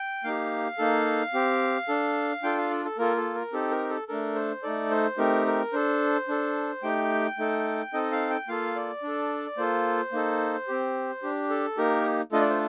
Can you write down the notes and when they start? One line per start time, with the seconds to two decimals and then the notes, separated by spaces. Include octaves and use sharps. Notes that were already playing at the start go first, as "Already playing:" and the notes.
Already playing: G5
0.24 A#3 D#4 G4 F5
0.78 A#3 D#4 A4
1.34 C4 G4
1.88 D4 A4
2.43 D4 F4 A4 G5
2.58 F5
2.70 D5
2.85 A4
2.98 A#3 F4 A4 A#4
3.17 A4
3.35 A#4
3.53 C4 D#4 G4 A4
3.71 A#4
3.90 A4
4.08 A3 D4 A4 A#4
4.35 C5
4.63 A3 D#4 A4 D5
4.91 C5
5.18 A3 C4 D#4 G4 A#4
5.46 A#4
5.73 D4 A4 C5
6.28 D4 A4
6.83 A3 D#4 G4 G5
7.38 A3 D#4 A4
7.93 C4 D#4 A4 D#5
8.12 F5
8.30 G5
8.48 A#3 F4 A4 F5
8.76 D5
9.03 D4 A4
9.57 A#3 F4 A4 C5
10.12 A#3 D#4 A4
10.68 C4 G4
11.22 D4 G4
11.50 A4
11.77 A#3 D#4 G4 A#4
12.32 A3 D4 F4 A4 D#5
12.41 D5
12.50 C5